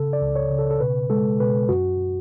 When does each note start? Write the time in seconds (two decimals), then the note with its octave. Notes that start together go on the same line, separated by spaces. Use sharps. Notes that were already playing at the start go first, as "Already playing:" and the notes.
Already playing: C#3 A4
0.13 D5
0.22 C#2
0.36 C#5
0.51 C#3
0.59 A4
0.71 A4
0.80 B2 B4
1.10 G#3 A4
1.39 B2 B4
1.69 F#2 F#4